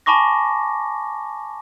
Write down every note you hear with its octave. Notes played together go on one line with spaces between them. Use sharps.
G#5 A5 B5 C#6 D6 A#6